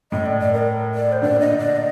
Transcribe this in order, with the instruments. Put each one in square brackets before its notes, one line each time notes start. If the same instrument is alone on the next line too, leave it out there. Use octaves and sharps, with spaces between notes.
[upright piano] A2 [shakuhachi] D#5
[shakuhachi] D5
D5
A#4
D5
C5
[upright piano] A#2 D3 [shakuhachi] D5
[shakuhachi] D#5
D5
D#5